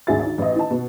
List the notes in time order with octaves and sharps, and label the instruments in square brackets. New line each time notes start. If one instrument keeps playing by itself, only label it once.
[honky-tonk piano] G#1 D2 G#4 E5 A6
D#3
A1 D#5
D#3 D#4 A5
B2